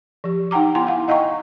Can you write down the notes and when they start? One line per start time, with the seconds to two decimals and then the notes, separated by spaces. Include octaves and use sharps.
0.24 F3 G4
0.51 D#4 F#5 G5 A#5 D6
0.75 B3 E4 G5 G#5 C6
0.87 F5 F#5
1.08 D#5 F5 G5 A#5 C#6